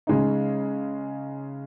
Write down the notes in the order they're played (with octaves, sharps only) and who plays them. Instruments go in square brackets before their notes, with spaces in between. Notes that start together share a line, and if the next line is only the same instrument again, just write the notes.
[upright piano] C#3 G#3 D#4